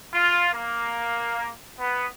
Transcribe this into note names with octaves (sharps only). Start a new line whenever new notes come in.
F4
A#3
B3